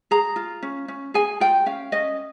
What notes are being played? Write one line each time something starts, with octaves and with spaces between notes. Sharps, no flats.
G#4 A#5
F4
C#4
C#4
G#4 G#5
F4 G5
C#4 F5
C#4 D#5